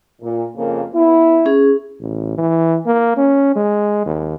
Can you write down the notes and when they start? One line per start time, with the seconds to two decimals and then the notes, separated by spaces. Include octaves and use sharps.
0.22 A#2
0.56 F2 C#3 A#3
0.93 B3 E4
1.46 C#4 G#4
2.00 A1
2.38 E3
2.86 A#3
3.17 C#4
3.56 G#3
4.06 D#2